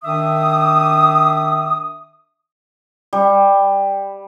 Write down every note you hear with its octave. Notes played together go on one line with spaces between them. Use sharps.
D#3 D4 E5 D6 D#6
G3